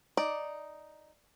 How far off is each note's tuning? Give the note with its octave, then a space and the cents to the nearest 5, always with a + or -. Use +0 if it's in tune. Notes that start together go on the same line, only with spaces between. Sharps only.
D#4 +0 D5 +0